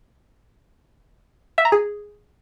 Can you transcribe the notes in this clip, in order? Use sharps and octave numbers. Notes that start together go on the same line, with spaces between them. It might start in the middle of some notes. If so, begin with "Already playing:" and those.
E5
A#5
G#4